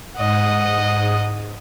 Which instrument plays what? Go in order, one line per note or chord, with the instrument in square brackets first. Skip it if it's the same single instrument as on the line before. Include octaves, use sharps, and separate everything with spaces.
[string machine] G#2 D#6 [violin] D#5 F#5